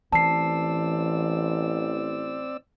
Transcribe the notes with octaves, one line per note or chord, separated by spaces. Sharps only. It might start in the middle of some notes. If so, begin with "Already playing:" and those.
A1 E3 C4 D5 A5 E6 C7